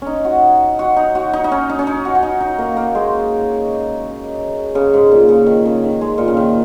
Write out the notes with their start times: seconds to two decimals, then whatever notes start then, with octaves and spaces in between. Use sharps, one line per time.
0.02 C#4 D#4
0.25 F#4
0.79 F#4
0.97 D#4
1.15 F#4
1.33 D#4
1.44 D#4
1.52 C#4
1.70 D#4
1.79 C#4
1.87 D#4
2.05 F#4
2.15 F#4
2.23 D#4
2.40 D#4
2.58 A#3
2.77 A#3
2.95 G#3
4.75 C#3
4.94 G#2
5.11 A#2
5.29 C#3
5.47 D#3
5.65 C#3
5.84 D#3
6.01 G#3
6.18 A#2
6.28 C#3
6.37 D#3